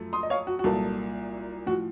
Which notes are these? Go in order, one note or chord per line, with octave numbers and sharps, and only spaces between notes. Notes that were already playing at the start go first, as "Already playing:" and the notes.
Already playing: F#2 F3 A3
C6 D#6
D#5
C#5 F5
F#4
F#4
C2 A#2 F#3 A#3 A4
A2 F3 F#4